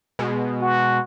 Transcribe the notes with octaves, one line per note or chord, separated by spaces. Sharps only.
B2 G#3
F#4